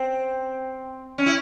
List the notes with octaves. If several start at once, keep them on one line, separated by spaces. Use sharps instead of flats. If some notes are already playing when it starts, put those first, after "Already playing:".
Already playing: C4
C#4
E4